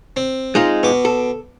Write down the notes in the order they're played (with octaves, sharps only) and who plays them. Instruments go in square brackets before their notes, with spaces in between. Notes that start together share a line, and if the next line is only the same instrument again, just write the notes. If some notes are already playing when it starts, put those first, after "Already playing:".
[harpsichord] C4
[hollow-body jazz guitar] G#3 D#4 F4
[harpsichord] B2 D6
[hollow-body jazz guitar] A4